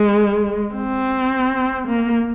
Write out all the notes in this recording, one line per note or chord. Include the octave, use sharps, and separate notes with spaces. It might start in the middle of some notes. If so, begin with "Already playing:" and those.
Already playing: G#3
C4
A#3